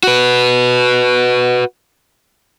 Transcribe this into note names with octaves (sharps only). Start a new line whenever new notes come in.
F#4 B4